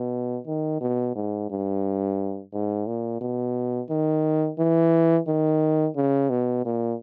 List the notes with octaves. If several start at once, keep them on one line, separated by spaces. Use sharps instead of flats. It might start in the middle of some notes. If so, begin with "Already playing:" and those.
Already playing: B2
D#3
B2
G#2
G2
G#2
A#2
B2
D#3
E3
D#3
C#3
B2
A#2